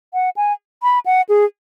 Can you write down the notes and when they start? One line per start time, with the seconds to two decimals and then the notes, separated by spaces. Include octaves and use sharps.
0.14 F#5
0.37 G#5
0.83 B5
1.06 F#5
1.29 G#4